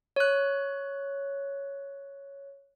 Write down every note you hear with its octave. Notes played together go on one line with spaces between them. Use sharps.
C#5 F#6